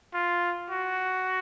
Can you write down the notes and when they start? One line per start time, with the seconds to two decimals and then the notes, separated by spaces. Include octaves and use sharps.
0.14 F4
0.70 F#4